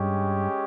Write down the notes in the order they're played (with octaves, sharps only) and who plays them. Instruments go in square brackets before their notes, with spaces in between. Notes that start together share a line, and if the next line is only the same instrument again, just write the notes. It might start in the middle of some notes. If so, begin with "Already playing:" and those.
Already playing: [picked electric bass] G2 [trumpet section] G#3 C#4 G4